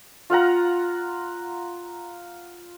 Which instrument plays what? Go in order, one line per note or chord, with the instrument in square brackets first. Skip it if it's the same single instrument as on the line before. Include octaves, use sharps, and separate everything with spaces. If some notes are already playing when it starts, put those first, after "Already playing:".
[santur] F4 F5 F#5 A#5